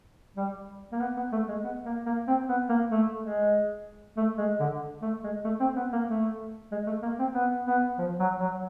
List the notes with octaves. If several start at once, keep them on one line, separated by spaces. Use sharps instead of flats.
G3
A#3
B3
B3
A3
G#3
B3
A#3
A#3
C4
B3
A#3
A3
G#3
A3
G#3
D3
A3
G#3
A3
C4
B3
A#3
A3
G#3
A3
A#3
C4
B3
B3
F3
F#3
F#3